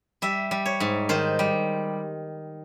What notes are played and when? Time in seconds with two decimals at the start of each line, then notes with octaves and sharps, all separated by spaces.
0.22 G3 E5
0.51 G3
0.66 C#5
0.80 G#2
1.09 D#3 C5
1.39 G3